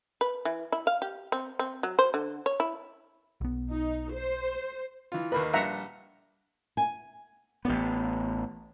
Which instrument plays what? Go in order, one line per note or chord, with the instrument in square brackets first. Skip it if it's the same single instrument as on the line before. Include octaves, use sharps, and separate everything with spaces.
[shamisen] B4
E3
E4
F5
G4
C4
C4
F#3
C5
D3
C#5
E4
[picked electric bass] B1 B3
[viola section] D#4
C5
[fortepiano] E3 F4
[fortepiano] D#2 A#3 B5 [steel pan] B4
[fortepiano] A#1 G3 [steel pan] E5 F#5 A#5
[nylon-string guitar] G#5
[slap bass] A1 B3 [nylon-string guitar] G4 D5